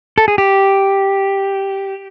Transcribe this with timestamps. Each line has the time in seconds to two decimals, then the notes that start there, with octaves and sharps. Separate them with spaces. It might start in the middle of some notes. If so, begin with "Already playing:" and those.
0.18 A4
0.28 G#4
0.38 G4